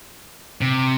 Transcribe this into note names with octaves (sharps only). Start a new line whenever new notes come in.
C3